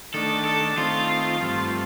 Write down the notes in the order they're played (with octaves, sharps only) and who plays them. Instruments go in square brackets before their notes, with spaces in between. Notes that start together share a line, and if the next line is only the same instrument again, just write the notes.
[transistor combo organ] D#3 A3 D4 [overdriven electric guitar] A4
[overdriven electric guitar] A4
[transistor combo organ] D#3 A3 C4 [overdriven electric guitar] F4
[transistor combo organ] G2 F3 A3 C4